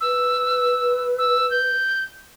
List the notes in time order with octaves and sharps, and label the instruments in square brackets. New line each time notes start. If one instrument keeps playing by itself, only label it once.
[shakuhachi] B4 [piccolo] E6
[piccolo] E6
G6